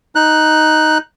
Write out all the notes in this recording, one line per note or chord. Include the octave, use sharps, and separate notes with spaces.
D#4 F#6